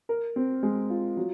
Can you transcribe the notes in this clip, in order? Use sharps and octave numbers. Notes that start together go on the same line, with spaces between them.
A#4
C4
G#3
F4
F#3